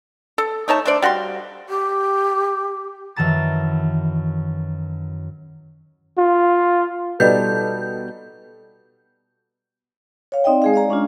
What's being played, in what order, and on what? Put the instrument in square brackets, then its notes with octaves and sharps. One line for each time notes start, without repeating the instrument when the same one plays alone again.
[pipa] A4
A3 D#4 C#5 A5
A3 D4 C5 D5
G3 F#4 F5 C6
[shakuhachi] G4
[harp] F#2 D#3 E3 A5 A#5 A6
[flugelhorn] F4
[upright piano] B2 G3 D#4 [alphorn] A4 [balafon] B4 D5 D#5 [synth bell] G6
[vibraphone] C#5 F5
C4 D#4 D5 D#5 G5
G#3 G#4 F5
D5 F5 A#5
G#3 C#4 D4 F4